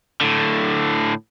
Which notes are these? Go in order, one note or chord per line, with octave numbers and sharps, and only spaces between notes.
A2 D3